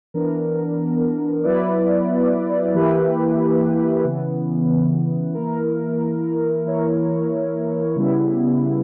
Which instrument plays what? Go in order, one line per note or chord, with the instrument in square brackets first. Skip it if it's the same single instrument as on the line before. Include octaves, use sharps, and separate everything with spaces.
[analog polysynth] E3 B3 D4 A#4
F#3 B3 E4 B4 D5
E3 A#3 E4 G4 B4
C#3 E3 B3
E3 A#3 E4 A#4
E3 A#3 E4 A#4 C#5
C#3 G3 B3 E4